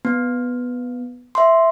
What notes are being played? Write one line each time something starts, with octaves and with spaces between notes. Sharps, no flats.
B3
E5 C6